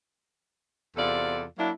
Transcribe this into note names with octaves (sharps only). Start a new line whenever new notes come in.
E2 C3 F4 A4 D5
F#3 A#3 D4 E4